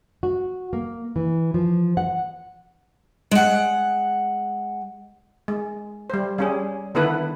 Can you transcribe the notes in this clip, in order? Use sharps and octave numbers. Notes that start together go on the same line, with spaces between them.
F#4
A#3
E3
F3
F#5
G#3 F#5
G#3
G3 C5
G3 C#4 G#4
D3 D#3 B3 E4 A4 B4